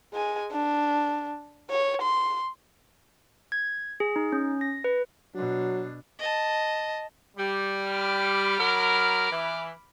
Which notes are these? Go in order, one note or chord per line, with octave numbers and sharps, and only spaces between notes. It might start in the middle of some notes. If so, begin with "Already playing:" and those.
G#3 G#5
D4
C#5
C6
G#6
G#4
D#4
C#4
A#6
B4
B2 F#3 D4
D#5 A5
G3
B5 D6 F6
F#3 A#4
E3